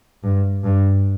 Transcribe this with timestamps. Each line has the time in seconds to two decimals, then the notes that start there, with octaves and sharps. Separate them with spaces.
0.24 G2
0.64 G2